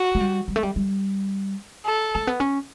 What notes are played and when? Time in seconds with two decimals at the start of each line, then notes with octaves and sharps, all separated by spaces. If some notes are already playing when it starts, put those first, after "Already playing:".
Already playing: F#4
0.15 A3
0.20 G3
0.48 G3
0.56 A3
0.63 G3
0.76 G3
1.86 A4
2.15 A3
2.27 B3
2.40 C#4